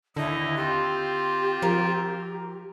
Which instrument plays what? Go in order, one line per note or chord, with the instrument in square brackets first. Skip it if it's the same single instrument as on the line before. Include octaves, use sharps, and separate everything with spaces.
[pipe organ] D#2 D#4 D#5 [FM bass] D3 [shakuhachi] E4
[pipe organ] C4 F4 [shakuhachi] G4
[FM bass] F3 [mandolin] A#4